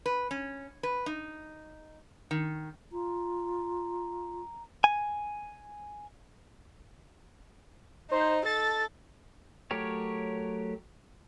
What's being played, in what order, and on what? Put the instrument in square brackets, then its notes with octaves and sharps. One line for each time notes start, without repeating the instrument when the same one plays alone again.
[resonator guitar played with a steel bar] B4
C#4
B4
D#4
D#3
[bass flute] F4 [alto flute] A#5
[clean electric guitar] G#5
[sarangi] D#4 [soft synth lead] C5
[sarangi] A4 [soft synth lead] A6
[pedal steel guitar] F#3 A3 G4 A#4 C#5